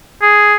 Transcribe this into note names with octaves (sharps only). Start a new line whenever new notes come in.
G#4